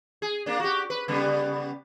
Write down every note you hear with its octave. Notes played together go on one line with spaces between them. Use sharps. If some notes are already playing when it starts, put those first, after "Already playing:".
G#4
A#3 D4
F#4 G4
B4
C#3 G3 B3